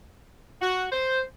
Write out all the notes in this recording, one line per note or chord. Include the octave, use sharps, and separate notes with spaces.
F#4
C5